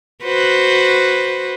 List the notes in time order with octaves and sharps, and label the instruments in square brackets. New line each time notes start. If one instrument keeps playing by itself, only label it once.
[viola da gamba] F#4 B4 C5